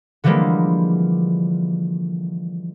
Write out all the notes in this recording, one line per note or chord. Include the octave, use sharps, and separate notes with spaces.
D3 E3 F3 G3 G#3 A#3